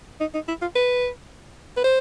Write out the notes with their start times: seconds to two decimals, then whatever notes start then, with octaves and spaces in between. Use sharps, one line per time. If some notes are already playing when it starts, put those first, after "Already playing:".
0.20 D#4
0.34 D#4
0.48 E4
0.62 F4
0.75 B4
1.77 B4
1.84 C5